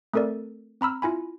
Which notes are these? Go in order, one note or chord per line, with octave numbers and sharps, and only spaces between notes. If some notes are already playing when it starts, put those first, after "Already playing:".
A3 C4 A4 A#4 D5
C4 A#5 B5 E6 F6
E4 F4 G#5 B5